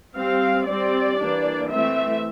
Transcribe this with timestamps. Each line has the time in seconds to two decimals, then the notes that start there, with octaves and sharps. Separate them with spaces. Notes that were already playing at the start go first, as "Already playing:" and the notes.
0.15 G3 C4 F5
0.66 G3 C4 D5
1.18 E3 A#3 D4
1.70 E3 A3 C4 E5